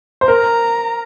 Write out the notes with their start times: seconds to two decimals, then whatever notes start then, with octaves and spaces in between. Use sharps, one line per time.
0.21 C5
0.28 A#4 A#5